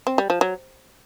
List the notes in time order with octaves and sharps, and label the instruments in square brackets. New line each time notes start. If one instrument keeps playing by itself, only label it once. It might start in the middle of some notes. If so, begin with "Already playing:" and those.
[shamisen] C4
G3
F3
F#3